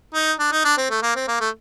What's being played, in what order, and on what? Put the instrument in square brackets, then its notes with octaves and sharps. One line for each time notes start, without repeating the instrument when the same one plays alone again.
[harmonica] D#4
D4
D#4
D4
C4
A3
A#3
C4
A#3
A3